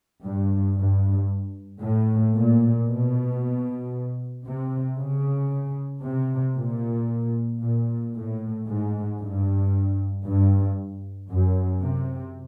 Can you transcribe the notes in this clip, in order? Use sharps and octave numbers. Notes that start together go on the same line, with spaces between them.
G2
G2
A2
A#2
B2
C3
C#3
C3
A#2
A#2
A2
G#2
G2
G2
F#2
C3